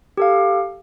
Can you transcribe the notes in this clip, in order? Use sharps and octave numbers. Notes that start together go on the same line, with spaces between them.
G4 A4 F5